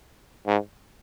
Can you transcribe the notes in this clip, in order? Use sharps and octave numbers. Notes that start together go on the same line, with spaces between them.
G#2